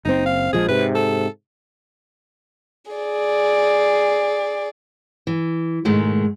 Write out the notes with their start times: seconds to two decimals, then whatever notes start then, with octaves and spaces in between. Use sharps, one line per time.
0.05 F#1 C4 D#4
0.26 F5
0.53 A#1 F3 G#3 G#4
0.69 G#2 C3 B4
0.95 A4
2.92 G#4 D5
5.27 E3
5.85 G#2 B2 D#3 G#3 A3